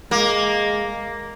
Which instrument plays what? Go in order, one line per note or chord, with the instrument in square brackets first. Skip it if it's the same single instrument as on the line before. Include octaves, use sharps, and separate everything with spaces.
[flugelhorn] G#3 [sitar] A#3